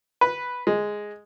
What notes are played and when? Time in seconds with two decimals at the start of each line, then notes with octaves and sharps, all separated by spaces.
0.21 B4
0.67 G#3